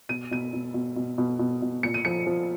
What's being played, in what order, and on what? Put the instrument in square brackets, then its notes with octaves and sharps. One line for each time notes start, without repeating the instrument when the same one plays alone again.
[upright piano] B2 D#7
B2 D#7
B2
B2
B2
B2
B2
B2
A#2 C#7
D#7
F3 C#7
F3